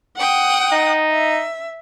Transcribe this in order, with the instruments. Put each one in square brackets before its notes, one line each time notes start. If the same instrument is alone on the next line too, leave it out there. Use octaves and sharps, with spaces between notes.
[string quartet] F#5 G5 D#6
[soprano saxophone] D#4
[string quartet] E5